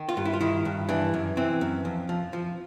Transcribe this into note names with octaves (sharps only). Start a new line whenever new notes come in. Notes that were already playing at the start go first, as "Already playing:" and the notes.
Already playing: D#3
F4
G2
E4
F4
D#3 E4
G2
E3 D4
F#2
E3 C4
F#2
F2
F3
F3